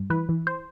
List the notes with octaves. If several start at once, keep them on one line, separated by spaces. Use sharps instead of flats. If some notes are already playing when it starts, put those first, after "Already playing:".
Already playing: G2
E3 B4
E3
C5